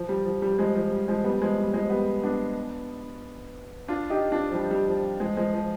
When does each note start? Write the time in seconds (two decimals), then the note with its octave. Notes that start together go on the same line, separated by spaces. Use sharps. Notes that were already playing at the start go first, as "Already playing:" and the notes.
Already playing: F3
0.09 G3
0.25 F3
0.42 G3
0.58 F3 G#3
0.75 F3
0.91 G3
1.08 F3 G#3
1.24 G3 B3
1.41 F3 G#3
1.58 G3
1.74 F3 G#3
1.90 G3 B3
2.23 B3 D4
3.88 D4 F4
4.10 D#4 G4
4.32 D4 F4
4.51 F3
4.54 G3
4.71 G3
4.87 F3
5.20 F3 G#3
5.37 F3 G#3
5.54 F3